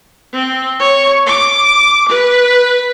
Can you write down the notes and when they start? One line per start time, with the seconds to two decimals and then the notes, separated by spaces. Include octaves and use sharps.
0.33 C4
0.79 C#5
1.26 D6
2.09 B4